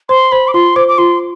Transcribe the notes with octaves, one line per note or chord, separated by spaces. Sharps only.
C5 C6
C5 B5
D6
F4 C6
C5 D6
D6
F4 C6